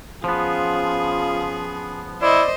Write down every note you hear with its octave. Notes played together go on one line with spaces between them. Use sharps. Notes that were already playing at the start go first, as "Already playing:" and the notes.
F3 B3 C#4 F4 G#4
E4 C5 D5 D#5